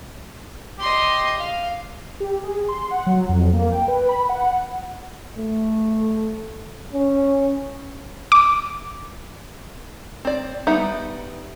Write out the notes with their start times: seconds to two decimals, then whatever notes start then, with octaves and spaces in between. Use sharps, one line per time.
0.80 G4 D#5 C6
1.38 F5
2.20 G4
2.43 G#4
2.68 C6
2.91 F#5
3.07 F#3
3.29 F2
3.53 A#3
3.72 G5
3.88 B4
4.09 B5
4.29 F#5
5.38 A3
6.93 C#4
8.32 D6
10.25 C4 D5
10.67 G3 B3 D#4 E5 F#5